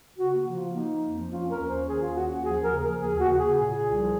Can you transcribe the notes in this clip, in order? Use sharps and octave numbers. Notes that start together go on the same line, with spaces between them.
C#3 F#4
A#3 F#4
F3
F4
A#3
A#3 D#4
A#3
F2
F3
C#4 F4
C#4 A#4
D#2
C#4 C5
D#3 G#4
D#2 F4
C#4 F#4
D#2 F#4
F3 G#4
D#2 A#4
C#3 G#4
F3 A#4
D#2 G#4
D#2 F#4
C#3 F#4
G#4
C#3
A#2 G#4
A#2
C2
F3